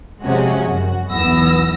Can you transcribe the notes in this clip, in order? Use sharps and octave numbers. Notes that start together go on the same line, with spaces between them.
C3 F3 G#3 C#4 F#4
F#2 F#4
B1 E2 E3 B3 E6 A#6